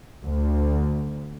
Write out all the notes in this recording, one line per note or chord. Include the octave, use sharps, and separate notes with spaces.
D2